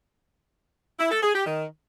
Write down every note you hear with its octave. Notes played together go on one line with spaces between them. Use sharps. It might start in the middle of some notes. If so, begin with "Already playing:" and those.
E4
A4
G#4
G4
D#3